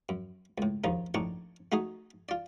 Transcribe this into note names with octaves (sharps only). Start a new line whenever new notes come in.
F#2
C#2 A2
A#1 D#2 F3 D#4
A#1 A2 D4 D#4 C#6
A3 D#4 F#4 G#4
F4 D5